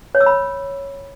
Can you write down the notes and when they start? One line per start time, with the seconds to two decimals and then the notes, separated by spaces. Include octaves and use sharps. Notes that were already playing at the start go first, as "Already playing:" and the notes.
0.15 C#5
0.21 E6
0.26 B5